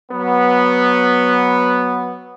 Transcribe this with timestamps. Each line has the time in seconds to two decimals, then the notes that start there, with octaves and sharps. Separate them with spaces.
0.10 F#3 B3